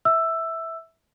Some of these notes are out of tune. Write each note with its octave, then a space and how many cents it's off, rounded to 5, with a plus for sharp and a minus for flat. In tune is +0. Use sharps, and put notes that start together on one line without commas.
E5 -10 E6 +10